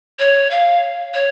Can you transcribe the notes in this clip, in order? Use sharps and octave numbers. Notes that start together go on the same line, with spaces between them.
C#5
F5
C#5